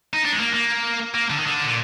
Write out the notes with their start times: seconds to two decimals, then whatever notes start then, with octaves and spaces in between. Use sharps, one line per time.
0.13 D#4
0.25 D4
0.32 G#3
0.40 A#3
0.54 A#3
1.14 A#3
1.30 D3
1.39 D#3
1.47 D3
1.64 A#2